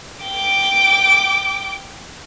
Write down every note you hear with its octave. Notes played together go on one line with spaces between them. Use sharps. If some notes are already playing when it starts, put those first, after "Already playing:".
G5 D6